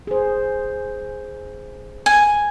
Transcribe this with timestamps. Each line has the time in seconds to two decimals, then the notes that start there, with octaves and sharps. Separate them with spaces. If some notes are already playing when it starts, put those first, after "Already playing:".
0.07 G#4 C5
2.06 G#5